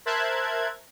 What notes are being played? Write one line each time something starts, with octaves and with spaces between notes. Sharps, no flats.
A#4 C5 E5 A5 F#6 G#6